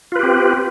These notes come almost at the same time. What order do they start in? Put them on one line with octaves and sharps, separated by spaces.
F4 B4 G4 C4